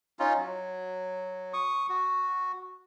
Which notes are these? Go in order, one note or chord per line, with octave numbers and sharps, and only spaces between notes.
C#4 D#4 F4
F#3
C#6 D#6
F#4